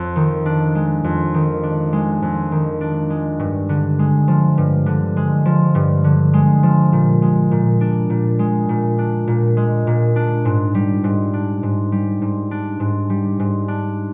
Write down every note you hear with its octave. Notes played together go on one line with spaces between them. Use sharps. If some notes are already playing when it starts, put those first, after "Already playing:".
Already playing: F2
D#3
D4
G#3
F2
D#3
D4
G#3
F2
D#3
D4
G#3
G2
D3
G#3
F3
G2
D3
G#3
F3
G2
D3
G#3
F3
A#2
G#3
A#2
D4
A#2
G#3
A#2
D4
A#2
G#3
A#2
D4
G#2
G3
G#2
D4
G#2
G3
G#2
D4
G#2
G3
G#2
D4